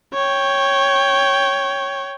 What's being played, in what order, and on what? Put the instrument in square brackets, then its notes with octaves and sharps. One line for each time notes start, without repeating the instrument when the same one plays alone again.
[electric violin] C#5 G5